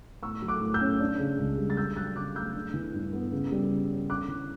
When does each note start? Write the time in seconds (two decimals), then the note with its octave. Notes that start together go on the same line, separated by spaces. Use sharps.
0.23 A2 C#6 E6
0.42 F#3
0.48 D6 F#6
0.61 A2
0.74 E6 G6
0.81 C#4
1.00 D4
1.19 C#3
1.38 C#2
1.58 G3
1.70 A6
1.77 D4 E6 G6
1.96 F#3 F#6 A6
2.16 C#3 D6 F#6
2.36 A3 E6 G6
2.55 D4
2.74 E3
2.94 G2
3.13 B3
3.32 C#3
3.52 G3
3.70 C#3
3.91 C#4
4.10 D4 D6 F#6
4.28 E3